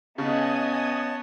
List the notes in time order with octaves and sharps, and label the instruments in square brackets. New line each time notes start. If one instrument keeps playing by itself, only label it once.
[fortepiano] C#3 D#4 [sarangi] B3 [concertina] C#5 A5 [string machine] D#5 G#5 D#6